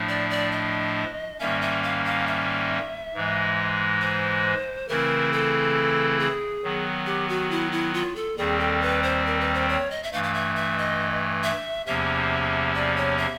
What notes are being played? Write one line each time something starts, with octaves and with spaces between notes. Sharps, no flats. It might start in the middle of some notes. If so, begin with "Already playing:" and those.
Already playing: A2 F3 A3 D4
D5
D5
D#5
G#2 D#3 G3 A#3 C#4 E5
E5
F5
F5
E5
G#2 E3 G#3
C5
C#3 E3 A3 C4 E4 A#4
A4
G#4
D#3 F#3 B3
G4
F#4
E4
E4
F4
A4
D#2 D#3 G3 C4 G#4
A4
B4
C5
A#4
B4
C5
C#5
D#5
E5
G2 E3 A3 F5
F5
E5
E5
D#5
E5
E2 C3 F3 A#3 C#4 E5
D5
C#5
E5